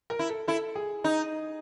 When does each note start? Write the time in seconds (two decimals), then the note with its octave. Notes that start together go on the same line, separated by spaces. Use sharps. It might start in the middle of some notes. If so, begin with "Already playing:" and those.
0.10 A#4
0.19 E4
0.29 A4
0.48 E4 A4
0.75 G#4
1.04 D#4